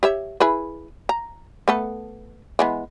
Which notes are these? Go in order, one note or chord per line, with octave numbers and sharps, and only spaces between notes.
G4 C#5 E5
E4 G#4 B4
A#5
A3 B3 A4
E3 G#3 B3